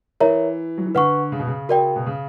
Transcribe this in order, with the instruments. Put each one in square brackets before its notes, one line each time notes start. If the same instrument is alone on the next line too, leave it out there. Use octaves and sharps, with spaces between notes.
[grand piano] E3 [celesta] A#4 C#5 E5 A#5
[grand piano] F#3
E3
[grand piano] D3 [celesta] B4 F#5 C#6
[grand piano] C#3
B2
C#3
[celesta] F#4 A#4 D5 G5
[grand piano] B2
C#3